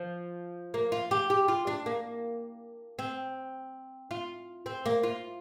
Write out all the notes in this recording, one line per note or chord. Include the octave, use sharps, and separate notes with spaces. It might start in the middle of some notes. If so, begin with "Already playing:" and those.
Already playing: F3
A#3
F4
G4
G4
F4
D4
A#3
C4
F4
C4
A#3
F4